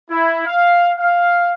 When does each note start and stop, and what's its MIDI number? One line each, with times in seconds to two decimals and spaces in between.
0.10 0.42 64
0.47 0.92 77
0.99 1.52 77